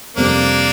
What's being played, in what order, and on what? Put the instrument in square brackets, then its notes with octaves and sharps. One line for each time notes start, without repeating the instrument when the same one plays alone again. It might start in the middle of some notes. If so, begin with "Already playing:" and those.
[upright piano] F2 C3 G3 C4 [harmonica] A#3 D4